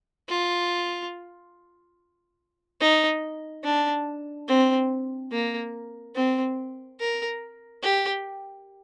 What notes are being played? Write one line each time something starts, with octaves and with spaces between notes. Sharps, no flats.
F4
D#4
D4
C4
A#3
C4
A#4
G4